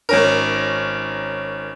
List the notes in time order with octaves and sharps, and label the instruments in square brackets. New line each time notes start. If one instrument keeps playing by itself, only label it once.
[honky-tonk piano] G#1 C#4 A#4